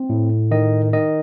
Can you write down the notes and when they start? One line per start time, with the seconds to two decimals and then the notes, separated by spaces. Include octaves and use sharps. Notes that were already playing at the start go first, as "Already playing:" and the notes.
Already playing: C4
0.10 A2
0.51 D#3 D#5
0.93 D#3 D#5